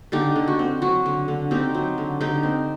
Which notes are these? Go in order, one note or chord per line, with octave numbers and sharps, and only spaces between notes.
D3 D#4 G4
D3
F#4
C4
F#3 F#4
D3
D3
C4 D#4 G4
F#3
D3
D3 D#4 G4
C4